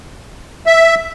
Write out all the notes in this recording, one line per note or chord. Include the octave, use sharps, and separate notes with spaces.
E5